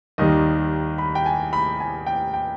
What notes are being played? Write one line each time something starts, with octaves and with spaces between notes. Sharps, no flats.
D#2 D#3 G3 D#5
B5
G5
G#5
B5
G#5
G5
G5